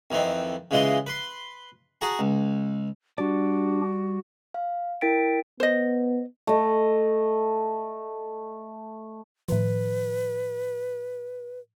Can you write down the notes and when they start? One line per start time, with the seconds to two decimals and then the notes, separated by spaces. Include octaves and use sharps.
0.11 F2 D#3 E3 C4
0.71 C#3 E3 G#3 F4 D#5 C6
1.07 B4 C6
2.01 F#4 G#4 A5 A#5
2.19 C#2
3.18 G3 D4 F#4 G4 D5
4.54 F5
5.01 E4 A#4 G5 A6 B6 D7
5.60 B3 C5 D#5
6.47 A3 D#5
9.49 A2 D#3 F3 B4